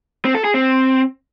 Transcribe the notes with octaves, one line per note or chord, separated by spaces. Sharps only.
C4
A4
G#4
C4